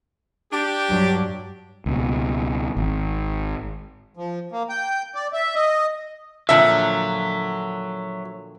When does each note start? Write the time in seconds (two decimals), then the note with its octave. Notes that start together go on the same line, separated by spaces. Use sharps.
0.52 D4 G4
0.87 G2 F#3
1.86 C#2 B2
2.77 G#1
4.17 F3
4.52 A#3
4.69 G5
5.15 D5
5.33 E5
5.55 D#5
6.49 A#2 D3 F3 F#3 E5